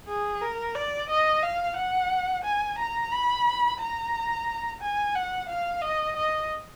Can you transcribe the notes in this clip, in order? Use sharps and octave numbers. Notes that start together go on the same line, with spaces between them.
G#4
A#4
D5
D#5
F5
F#5
G#5
A#5
B5
A#5
G#5
F#5
F5
D#5
D#5